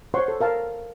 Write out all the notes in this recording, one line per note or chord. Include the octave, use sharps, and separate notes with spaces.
C5 C#5 F#5 C6 C#6
A4
A#4 F5 A5